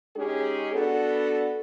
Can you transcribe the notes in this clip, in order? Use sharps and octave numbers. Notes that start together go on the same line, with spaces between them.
G#3 C#4 D#4 G4 G#4
B3 D4 F#4 A4